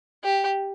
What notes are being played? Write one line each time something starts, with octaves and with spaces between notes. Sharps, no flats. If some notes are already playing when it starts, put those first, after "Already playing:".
G4